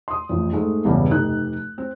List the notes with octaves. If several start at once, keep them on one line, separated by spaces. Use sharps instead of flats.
C6 D#6
A1 F2
G#2 G#3 A3
A#1 E2 G2 C#3
F1 D#4 G4 A4 F#6
C4